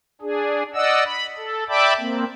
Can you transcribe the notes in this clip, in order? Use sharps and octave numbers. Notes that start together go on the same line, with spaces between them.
D4 G#4
D5 D#5 F#5 E6
B5
A4
D5 E5 G5 A5 B5 D6
A#3 C4